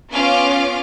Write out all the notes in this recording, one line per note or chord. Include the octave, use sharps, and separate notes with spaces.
B3 C#4 F4 F5 D6